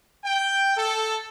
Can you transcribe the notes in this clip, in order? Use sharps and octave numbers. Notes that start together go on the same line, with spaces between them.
G5
A4